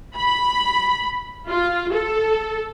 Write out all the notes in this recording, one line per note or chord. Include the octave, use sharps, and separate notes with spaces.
B5
F4
A4